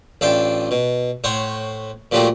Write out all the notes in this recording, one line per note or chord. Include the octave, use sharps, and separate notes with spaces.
A1 D4 F4 E5 G5 C6
B2
A2 C5 C#5 F#5
A#2 F3 F#3 A3 A#3 G4